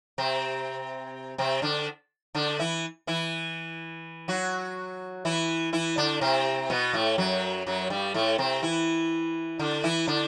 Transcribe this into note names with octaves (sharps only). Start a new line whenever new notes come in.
C3 C4
C3 C4
D3 D4
D3 D4
E3 E4
E3 E4
F#3 F#4
E3 E4
E3 E4
D3 D4
C3 C4
B2 B3
A2 A3
F#2 F#3
F#2 F#3
G2 G3
A2 A3
C3 C4
E3 E4
D3 D4
E3 E4
D3 D4